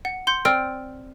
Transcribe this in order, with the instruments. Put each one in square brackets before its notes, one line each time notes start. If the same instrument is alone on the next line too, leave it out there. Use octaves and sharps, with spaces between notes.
[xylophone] F#5
C6 G6 C#7
[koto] C4 [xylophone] D5 F6 D7